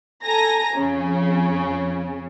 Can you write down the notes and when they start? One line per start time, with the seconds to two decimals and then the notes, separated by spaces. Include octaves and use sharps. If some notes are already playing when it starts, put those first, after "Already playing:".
0.24 A4 G#5 A#5 A#6
0.75 F2 C#3